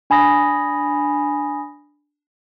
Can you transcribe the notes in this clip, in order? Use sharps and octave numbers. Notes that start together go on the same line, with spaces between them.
D4 G#5 B5 D#6 A#6